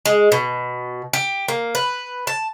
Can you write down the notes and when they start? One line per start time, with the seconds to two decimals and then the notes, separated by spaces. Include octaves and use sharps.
0.06 G#3
0.32 B2
1.13 G4
1.48 A#3
1.75 B4
2.27 A5